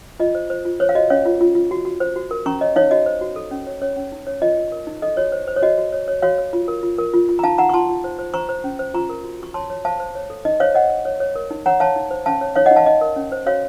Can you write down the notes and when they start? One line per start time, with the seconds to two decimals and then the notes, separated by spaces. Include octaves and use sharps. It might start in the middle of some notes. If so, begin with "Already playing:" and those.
0.20 F4 D#5
0.35 C5
0.50 C5
0.65 F4
0.80 C5 C#5
0.89 F5
0.95 F#4 D#5
1.10 C#4 C#5 F5
1.25 F4
1.41 F4
1.55 F4
1.71 F#4
1.85 F#4
2.00 C5
2.16 F#4
2.31 A#4
2.46 C#4 A#5 C#6
2.61 C#5 D#5
2.76 D#4 C#5 F5
2.91 F#4 D#5
3.06 C5
3.21 F#4
3.36 A4
3.51 C#4
3.67 C#5
3.82 C#4 C#5
3.96 C#4
4.12 D#4
4.27 C#5
4.42 F4 D#5
4.57 F4
4.72 A#4
4.87 D#4
5.02 A4 D#5
5.17 F#4 C#5
5.32 C5
5.48 C5
5.56 C#5
5.62 F#4 D#5
5.78 F#4
5.92 C#5
6.08 C#5
6.22 F#4 C#5 F5
6.38 C#5
6.53 F4
6.68 A#4
6.83 F4
6.98 A#4
7.13 F4
7.29 F4
7.39 A#5
7.43 D#4 F5 A5
7.58 D#4 F#5 A#5
7.69 C#6
7.74 F4 A5 C6
7.89 F4
8.04 C5
8.19 C5
8.34 C5 A#5 C#6
8.49 C5
8.64 C#4
8.79 C5
8.94 F4 A#5 C#6
9.09 A#4
9.24 F#4
9.40 F#4 C#6
9.54 C#5 A5 C6
9.70 C#5
9.85 C5 F5 A5
10.00 C5
10.15 C#5
10.30 A4
10.45 D#4 D#5
10.60 C5 C#5 F5
10.75 C#5 D#5 F#5
10.90 C#5
11.05 C#5
11.20 C#5
11.35 A#4
11.51 D#4
11.66 C#5 F#5 A#5
11.80 C#5 F5 A5
11.96 D#4
12.11 C5
12.26 C#4 F5 A5
12.41 C#5
12.56 D#4 C#5 F5
12.66 D#5 F#5
12.71 D#4
12.76 F5 A5
12.86 D#4 D#5
13.01 A#4
13.16 C#4
13.32 C5
13.46 F#4 C#5 F5